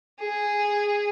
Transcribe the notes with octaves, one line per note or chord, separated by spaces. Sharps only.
G#4